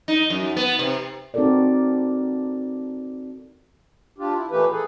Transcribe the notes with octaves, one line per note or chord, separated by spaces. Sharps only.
D#4
F#2
B3
C3
C4 D#4 F#4 A4 A#4 D5
D4 F4 G4
E4
A#2 E3 A3 A#3 G4 B4
G#4 A4